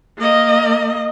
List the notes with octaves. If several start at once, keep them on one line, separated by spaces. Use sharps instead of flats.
A#3 D#5